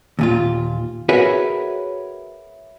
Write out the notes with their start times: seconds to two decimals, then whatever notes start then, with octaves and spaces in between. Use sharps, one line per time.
0.19 D#2 A#2 F4
1.09 F#4 G#4 A#4 B4 C#5 E5